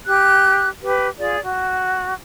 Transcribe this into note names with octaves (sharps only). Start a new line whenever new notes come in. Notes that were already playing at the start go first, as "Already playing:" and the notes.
G4 F#6
G4 B4
F4 G#4 D5
F#4